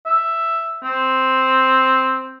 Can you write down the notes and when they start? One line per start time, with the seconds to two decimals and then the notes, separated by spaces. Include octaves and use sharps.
0.06 E5
0.84 C4